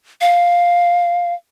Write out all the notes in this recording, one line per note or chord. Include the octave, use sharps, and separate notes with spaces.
F5